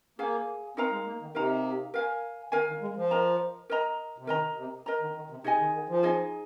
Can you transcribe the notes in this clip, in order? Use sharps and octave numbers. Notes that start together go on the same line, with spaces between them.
A#3 G#4 F5 G#5
C4 D#4 A#4 F5 A#5
G#3
A#3
D#3
C3 D#4 A#4 F5 A#5
A#4 F5 G#5
D#3 A#4 F5 G#5
D#3
G#3
F3
A#4 D#5 A#5
A#4 D#5 A#5
C3
D#3 A#4 D#5 A#5
C3
A#4 D#5 A#5
D#3
D#3
C3
C3 D#4 G#4 D#5 G#5
D#3
D#3
F3
D#4 G#4 D#5 G#5